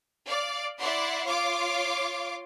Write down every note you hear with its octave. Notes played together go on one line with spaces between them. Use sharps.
D5 F5
E4 D5 F#5 C6
F4 C#5 F5 C6 D6